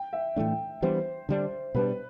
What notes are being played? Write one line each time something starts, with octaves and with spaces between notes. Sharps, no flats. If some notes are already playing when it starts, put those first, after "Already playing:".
Already playing: G5
E5
A2 E3 A3 D4
E3 G3 B3 D4 C5
D3 G3 D4
B2 G3 D4 B4